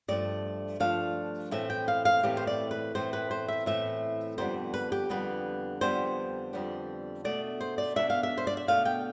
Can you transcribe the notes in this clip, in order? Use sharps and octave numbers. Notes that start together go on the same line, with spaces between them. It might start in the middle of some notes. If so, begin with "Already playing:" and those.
G2 F3 A3 D4 D5
G2 F3 A3 D4 F5
A2 E3 A3 C4 E5
G5
F5
F5
A2 E3 A3 C4 G4
C5
D5
B4
A2 E3 A3 C4 C5
B4
C5
E5
A2 E3 A3 C4 E5
F2 D3 G3 B3 D4 C5
B4
G4
F2 D3 G3 B3 D4 B4
F2 D3 G3 B3 D4 C5
F2 D3 G3 B3 D4
B2 A3 D4 D5
C5
D5
B2 A3 D4 E5
F5
E5
C5
D5
E5
B2 A3 D4 F5
G5